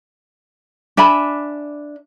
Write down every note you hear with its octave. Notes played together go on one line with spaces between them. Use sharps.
D4 E5 G#5 B5